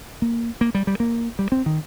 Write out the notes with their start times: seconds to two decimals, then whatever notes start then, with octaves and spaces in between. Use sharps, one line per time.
0.22 A#3
0.61 A#3
0.75 G3
0.87 G3
1.00 A#3
1.39 G3
1.52 C4
1.66 D#3